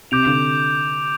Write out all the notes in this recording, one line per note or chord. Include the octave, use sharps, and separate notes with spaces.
C3 D6 G6 D7 F7
D3